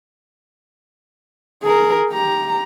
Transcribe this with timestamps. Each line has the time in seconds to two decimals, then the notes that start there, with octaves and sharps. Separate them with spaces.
1.63 G#4 A#4
2.10 G4 A#5